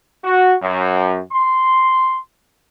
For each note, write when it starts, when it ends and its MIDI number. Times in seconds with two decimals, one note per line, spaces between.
0.24 0.54 66
0.63 1.20 42
1.32 2.18 84